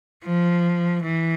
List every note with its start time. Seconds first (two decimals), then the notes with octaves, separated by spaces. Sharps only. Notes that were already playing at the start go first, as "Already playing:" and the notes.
0.24 F3
1.04 E3